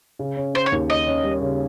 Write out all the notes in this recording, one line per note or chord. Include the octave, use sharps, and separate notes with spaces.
C#3
C#4
C#4 C5
C#5
D#2
C#4 D#5
C#4
G3
C#3